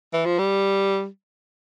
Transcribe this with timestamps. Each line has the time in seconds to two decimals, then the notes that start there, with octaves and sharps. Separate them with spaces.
0.13 E3
0.25 F3
0.39 G3